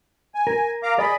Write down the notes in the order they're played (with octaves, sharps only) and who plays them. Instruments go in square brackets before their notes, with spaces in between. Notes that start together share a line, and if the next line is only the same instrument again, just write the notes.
[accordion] G#5
[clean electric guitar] A#4
[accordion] F5 A#5 D6
[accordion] G#4 D#5 B5 [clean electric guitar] D5